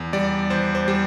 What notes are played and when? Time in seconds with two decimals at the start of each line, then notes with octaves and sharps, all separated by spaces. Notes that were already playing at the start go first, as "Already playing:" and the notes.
Already playing: E2
0.13 G3 D5
0.50 E2 C5
0.75 C5
0.88 G3